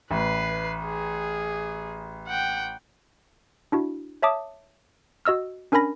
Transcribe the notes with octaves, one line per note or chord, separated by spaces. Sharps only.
A1 B4 C7
G#4
F#5 G5
D4 E4 F#4
C#5 E5 A5 D6 D#6
F#4 D#5 E6 F6
C#4 D4 A#4 G#5 B5 A#6